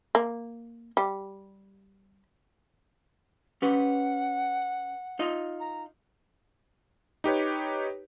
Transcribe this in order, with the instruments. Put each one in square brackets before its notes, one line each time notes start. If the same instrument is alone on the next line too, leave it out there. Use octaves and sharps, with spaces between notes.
[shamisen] A#3
G3
[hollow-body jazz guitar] C#4 G4 B4 [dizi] F#5
[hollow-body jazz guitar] D#4 F4 D#5
[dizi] A#5
[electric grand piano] D#4 G4 B4 C#5